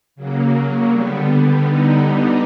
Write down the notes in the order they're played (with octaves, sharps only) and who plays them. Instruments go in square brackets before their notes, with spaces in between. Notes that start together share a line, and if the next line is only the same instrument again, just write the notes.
[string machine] C#3 F#3 A#3
D3 G3 B3
D3 G3 B3 D#4